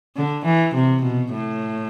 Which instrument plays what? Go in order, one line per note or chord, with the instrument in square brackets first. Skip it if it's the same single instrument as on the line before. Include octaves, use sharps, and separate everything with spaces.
[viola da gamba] D3
E3
C3
B2
A2